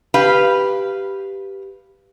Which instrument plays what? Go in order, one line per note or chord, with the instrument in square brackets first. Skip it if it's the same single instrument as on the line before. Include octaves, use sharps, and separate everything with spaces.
[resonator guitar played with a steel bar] G4 B4 F5